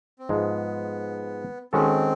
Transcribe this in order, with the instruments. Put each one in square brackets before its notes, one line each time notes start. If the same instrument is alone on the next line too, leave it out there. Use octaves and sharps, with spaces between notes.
[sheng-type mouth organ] C4
[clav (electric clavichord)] G#2 F3 G#3 [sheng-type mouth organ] B3
[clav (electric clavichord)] D#3 G#3 C#4 F#4 A4 [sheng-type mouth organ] C4